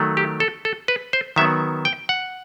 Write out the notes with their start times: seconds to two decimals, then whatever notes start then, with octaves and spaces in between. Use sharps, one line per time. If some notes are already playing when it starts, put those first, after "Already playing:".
Already playing: D#3 F#3 A3
0.17 G4
0.40 A4
0.65 A4
0.88 B4
1.13 C5
1.36 D#3 F#3 B3 E5
1.85 G5
2.09 F#5